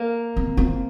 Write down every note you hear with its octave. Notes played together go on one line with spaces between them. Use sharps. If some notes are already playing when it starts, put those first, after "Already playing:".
Already playing: A#3
C4
C4